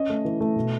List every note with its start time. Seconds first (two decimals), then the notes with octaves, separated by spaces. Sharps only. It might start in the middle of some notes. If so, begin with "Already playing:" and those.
Already playing: C#4 D#5
0.09 A3
0.25 E3
0.41 A3
0.56 B2